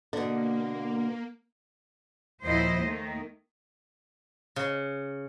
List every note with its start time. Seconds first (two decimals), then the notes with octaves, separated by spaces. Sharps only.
0.13 B2 D3 A#3
2.44 D#2 A#2 F3 E4 C5 D#5
2.82 D#3 A3 A#3
4.56 C#3